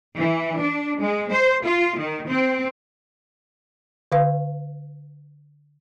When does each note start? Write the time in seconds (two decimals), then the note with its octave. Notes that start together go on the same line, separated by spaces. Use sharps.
0.17 E3
0.59 D4
1.00 G#3
1.32 C5
1.64 F4
1.97 D#3
2.28 C4
4.12 D3 B4 F5